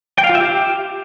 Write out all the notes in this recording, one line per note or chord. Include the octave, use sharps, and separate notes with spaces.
G5
F5
F4
E5
G4